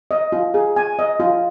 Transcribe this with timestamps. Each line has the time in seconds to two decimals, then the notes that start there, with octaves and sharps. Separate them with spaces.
0.11 D#5
0.32 F4
0.54 G#4
0.76 G#5
0.99 D#5
1.20 F4